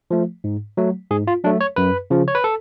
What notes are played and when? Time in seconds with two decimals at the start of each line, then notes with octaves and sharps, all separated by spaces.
0.11 F3 A3
0.44 G#2
0.77 F#3 A3
1.11 G#2 G#4
1.27 F4
1.44 F#3 A3 D4
1.61 C#5
1.76 F#2 B4
2.10 C#3 F3
2.28 C#5
2.35 B4
2.44 A4